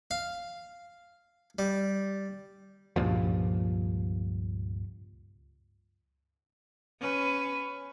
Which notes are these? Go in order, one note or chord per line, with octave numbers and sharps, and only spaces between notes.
F5
G3
C#2 G2 A#2 F3
C#4 B4